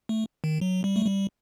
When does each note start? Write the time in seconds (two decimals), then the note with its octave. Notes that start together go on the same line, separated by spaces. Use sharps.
0.09 A3
0.44 D#3
0.61 F#3
0.84 G3
0.96 A3
1.06 G3